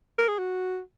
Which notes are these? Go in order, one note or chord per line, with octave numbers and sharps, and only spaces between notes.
A#4
G#4
F#4